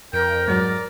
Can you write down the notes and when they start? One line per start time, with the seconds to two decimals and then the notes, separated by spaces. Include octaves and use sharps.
0.13 F2 A#4 G5
0.48 G#2 F#3 D5